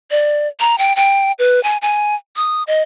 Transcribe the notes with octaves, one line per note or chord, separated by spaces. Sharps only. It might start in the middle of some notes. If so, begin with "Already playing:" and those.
D5
A#5
G5
G5
B4
G#5
G#5
D#6
D#5